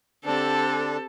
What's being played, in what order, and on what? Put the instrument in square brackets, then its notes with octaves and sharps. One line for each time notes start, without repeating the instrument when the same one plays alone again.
[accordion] D3 D4 [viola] C4 G4 [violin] A4